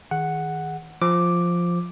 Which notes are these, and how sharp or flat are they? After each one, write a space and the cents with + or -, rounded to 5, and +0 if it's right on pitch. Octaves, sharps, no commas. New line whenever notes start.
D#3 +30 G#4 +0 F#5 +0
F3 +0 D6 +0